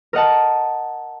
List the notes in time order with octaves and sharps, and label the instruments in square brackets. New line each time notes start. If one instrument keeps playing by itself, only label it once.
[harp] A#4 D#5 F#5 A5